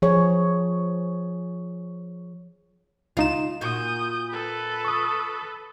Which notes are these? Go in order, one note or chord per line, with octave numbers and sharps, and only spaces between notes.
F3 G#4 C#5
C#2 D#4 F4 E7
A#2 F#4 D#6 G6
A4 B4
C#6 D#6